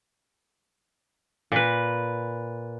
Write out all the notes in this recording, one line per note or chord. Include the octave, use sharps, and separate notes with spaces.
A#2 B4